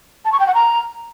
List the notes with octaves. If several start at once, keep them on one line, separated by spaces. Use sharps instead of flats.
A5
C#6
G5
F#5
A#5